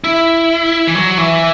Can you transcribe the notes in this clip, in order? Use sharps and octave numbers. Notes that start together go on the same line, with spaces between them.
E4
E3
F#3
E3